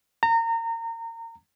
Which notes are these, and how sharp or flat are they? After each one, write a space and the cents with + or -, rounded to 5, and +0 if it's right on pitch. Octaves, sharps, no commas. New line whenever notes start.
A#5 -30